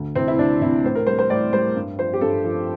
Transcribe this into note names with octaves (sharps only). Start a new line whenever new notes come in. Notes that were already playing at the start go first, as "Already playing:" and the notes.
Already playing: D2
C3 E3 C4
E4
D2 D4
C3 E3 E4
A2 C5
A#4
G3 C5
C5
A2 D5
G3 C5
G2
F3 C5
G4
G2 A4
F3